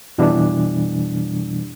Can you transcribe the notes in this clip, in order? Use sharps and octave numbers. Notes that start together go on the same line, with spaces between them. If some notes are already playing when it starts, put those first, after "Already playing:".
F2 B2 E3 G3 D4